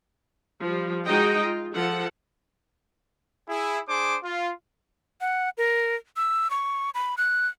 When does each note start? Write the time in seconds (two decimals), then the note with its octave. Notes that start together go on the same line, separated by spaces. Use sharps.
0.62 F3 G3
1.06 G#3 D#4 F#4 D#5 G5
1.43 F4
1.74 F3 A4 F#5
3.49 E4 G#4
3.89 D4 G#4 C5 D6
4.23 F4
5.21 F#5
5.58 A#4
6.17 E6
6.50 C#6
6.95 B5
7.18 F#6